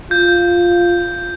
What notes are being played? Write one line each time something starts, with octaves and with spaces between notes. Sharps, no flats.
F4 G6